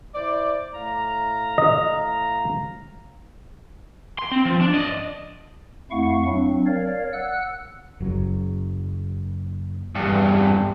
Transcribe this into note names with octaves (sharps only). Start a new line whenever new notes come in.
E4 C5 D5
A2 F5 A#5
D#5
C6
C4
F3
D4
D5 D#5
F2 A3 E4 F5 F#5 C#6
F#3 C4 D4
A#4 C#5 D5 F5
F#5 E6 F#6
F#1 F#3
E2 G2